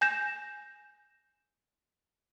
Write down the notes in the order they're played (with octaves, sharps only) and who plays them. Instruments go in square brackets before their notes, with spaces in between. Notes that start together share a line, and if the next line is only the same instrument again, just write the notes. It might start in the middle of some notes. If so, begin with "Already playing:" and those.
[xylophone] G#5 G6 A#6 E7